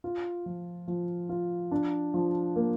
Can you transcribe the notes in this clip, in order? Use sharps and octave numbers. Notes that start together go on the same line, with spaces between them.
F4
F3
F3
F4
D4
F3
A#3